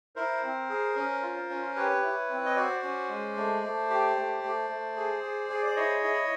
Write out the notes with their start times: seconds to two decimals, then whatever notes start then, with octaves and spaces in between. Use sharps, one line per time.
0.16 E4 A#4 C5
0.42 C4
0.69 G#4
0.96 C#4
1.22 F4
1.50 C#4
1.76 G4 B4 C#5
2.02 E4
2.29 C4
2.45 D#5
2.56 F#4 C5 D5
2.83 C#4
3.09 G#3
3.36 A3
3.63 A3
3.90 G4
4.16 A3
4.43 A3
4.70 A3
4.96 G#4
5.23 G#4
5.50 G#4
5.66 D5
5.76 E4 C#5 D#5
6.04 E4